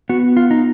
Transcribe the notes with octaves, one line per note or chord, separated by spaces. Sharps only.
B3 F#4
F4
D#4